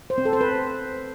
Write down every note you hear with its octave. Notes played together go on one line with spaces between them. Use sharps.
C5
C4
A4
C5
B4